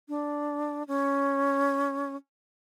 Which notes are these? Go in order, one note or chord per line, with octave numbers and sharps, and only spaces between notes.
D4
C#4